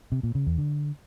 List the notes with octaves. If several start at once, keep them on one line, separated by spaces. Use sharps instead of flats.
C3
A#2
C#3
E2
D3